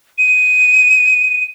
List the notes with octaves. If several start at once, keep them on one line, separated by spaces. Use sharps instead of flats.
D#7